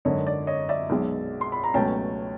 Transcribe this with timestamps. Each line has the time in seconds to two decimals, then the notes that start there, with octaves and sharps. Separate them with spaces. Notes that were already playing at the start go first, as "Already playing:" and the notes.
0.05 G#1 F#2 D3 C#5 D#5
0.27 D5
0.47 C#5 D#5
0.69 D5 E5
0.90 B1 B2 G#3
1.41 C6
1.52 B5
1.64 A#5
1.74 C#2 B2 F#3 A3 C#4 G5 A5